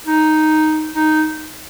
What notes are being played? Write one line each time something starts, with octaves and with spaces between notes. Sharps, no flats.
D#4
D#4